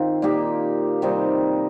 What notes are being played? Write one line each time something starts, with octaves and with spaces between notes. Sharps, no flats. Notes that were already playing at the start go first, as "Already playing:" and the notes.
Already playing: D#3 C4 F4
A#2 A#3 D#4 G4
C3 G3 C4 D#4